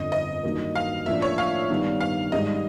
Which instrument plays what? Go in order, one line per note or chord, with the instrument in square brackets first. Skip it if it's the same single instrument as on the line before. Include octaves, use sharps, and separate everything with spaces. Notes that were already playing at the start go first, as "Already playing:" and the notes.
Already playing: [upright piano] G1 F2 D3 [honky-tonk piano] D#5
[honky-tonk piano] D#5
[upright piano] G2 D#3 F#3 A#3
[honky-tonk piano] F5
[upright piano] A1 A2 F3 A#3 D4 [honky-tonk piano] E5
[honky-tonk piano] C#5
F5
[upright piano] G2 D#3 G3 B3 D4
[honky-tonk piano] F5
[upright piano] G#2 D#3 G3 [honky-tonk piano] D#5